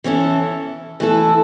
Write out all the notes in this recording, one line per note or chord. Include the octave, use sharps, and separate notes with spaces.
E3 C#4 E4 A4
E3 A3 E4 A4